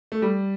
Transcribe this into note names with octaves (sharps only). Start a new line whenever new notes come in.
A3
G3